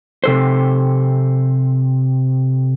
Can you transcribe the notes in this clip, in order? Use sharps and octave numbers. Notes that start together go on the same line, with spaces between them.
C3 A4 C5